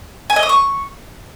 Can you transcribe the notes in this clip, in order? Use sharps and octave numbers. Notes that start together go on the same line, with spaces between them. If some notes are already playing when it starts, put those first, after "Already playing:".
G#5
D#5
D#6
C#6